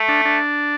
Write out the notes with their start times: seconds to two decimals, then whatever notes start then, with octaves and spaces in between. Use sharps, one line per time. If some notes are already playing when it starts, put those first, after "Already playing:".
Already playing: A3
0.08 D4
0.25 D4